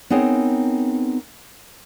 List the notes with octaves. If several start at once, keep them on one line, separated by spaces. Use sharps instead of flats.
B3 C4 D#4 G#4 A#4 C#5